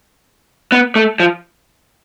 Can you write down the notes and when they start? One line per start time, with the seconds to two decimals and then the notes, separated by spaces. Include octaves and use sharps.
0.72 B3
0.96 A3
1.20 F3